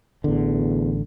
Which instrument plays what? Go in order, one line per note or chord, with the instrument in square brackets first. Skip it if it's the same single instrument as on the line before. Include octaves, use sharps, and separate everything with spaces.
[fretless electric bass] A1 D3 [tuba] E2